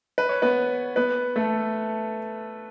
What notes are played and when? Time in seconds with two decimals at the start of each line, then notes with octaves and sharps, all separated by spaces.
0.18 B4
0.29 C#5
0.42 B3 B4
0.96 B3 B4
1.36 A3 A4